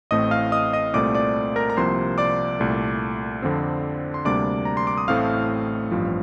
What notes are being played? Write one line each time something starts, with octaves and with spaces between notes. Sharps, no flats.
A1 A2 A3 C4 D#5 D#6
F5 F6
D#5 D#6
D#5 D#6
C2 A#2 A3 C4 D5 D6
D5 D6
A#4 A#5
A#5
C2 C3 F3 A#3 C5 C6
D5 D6
C2 A#2 A3
F2 D3 F3 C4
C6
D2 C3 G3 A#3 D4 D5 D6
A#5
C6
D6
D#6
A1 A2 A3 C4 F5 F6
A1 G2 F3 C4